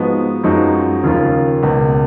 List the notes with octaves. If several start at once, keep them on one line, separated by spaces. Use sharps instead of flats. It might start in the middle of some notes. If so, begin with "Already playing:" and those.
Already playing: G#2 F3 G#3 B3 F#4
F#2 F3 G#3 D#4 F#4
D#2 C#3 F3 A#3 F4
C#2 B2 A#3